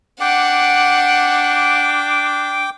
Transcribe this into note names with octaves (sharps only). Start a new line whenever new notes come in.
D4 F#5 G5 D6